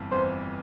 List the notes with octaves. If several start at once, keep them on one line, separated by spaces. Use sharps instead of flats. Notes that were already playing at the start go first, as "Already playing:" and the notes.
Already playing: G1 F2 E3
G1 F2 E3 C5